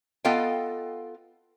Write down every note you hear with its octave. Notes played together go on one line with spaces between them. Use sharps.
B3 F4 A4 D#5 F5 G5